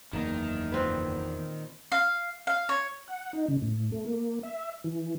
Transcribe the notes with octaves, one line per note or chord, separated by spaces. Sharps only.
F#1 E2 D#3 A#3
A#2 C4 B4
F5
F5
C#5
F#5
D#4
C#3
A2
A3
A#3
E5
E3